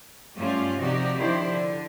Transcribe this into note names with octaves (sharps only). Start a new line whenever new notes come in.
G2 F#3 A3 C#4 F4 G4
C3 F3 D#4 F#4 G4 D5
D#3 F3 D4 E4 G4 C5
D3